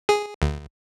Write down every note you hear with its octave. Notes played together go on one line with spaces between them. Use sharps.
G#4
D2